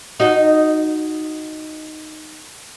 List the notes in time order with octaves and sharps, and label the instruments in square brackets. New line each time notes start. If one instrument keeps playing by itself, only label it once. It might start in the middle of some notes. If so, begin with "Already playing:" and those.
[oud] D#4 F#4 D#5